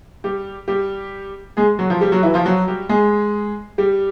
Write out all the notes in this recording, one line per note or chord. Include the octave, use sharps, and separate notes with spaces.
G3 G4
G3 G4
G#3 G#4
F#3 F#4
F3 F4
G3 G4
F#3 F#4
E3 E4
F3 F4
F#3 F#4
G3 G4
G#3 G#4
G3 G4